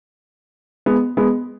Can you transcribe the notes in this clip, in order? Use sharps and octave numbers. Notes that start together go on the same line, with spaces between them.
G#3 B3
G#3 B3